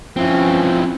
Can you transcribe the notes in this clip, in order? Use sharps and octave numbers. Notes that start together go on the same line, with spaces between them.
E3 F3 C4 C#4